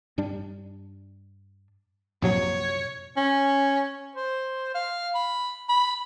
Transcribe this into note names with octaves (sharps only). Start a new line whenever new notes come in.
G2 G3 D4
A#1 F#2 C3 F#3 C#5
C#4
C5
F5
B5
B5